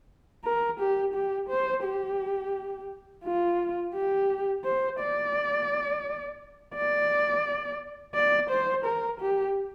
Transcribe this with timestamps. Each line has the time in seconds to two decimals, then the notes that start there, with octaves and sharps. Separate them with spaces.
0.45 A#4
0.80 G4
1.14 G4
1.49 C5
1.84 G4
3.25 F4
3.95 G4
4.65 C5
5.00 D5
6.75 D5
8.15 D5
8.50 C5
8.85 A#4
9.20 G4